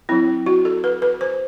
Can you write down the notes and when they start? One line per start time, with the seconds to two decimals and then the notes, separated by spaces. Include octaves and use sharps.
0.09 F#3 C4 E4
0.46 F#4
0.65 A4
0.84 B4
1.02 B4
1.21 C5